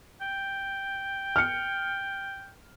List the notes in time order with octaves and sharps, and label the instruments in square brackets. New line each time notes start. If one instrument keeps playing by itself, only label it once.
[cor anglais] G5
[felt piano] F6 C#7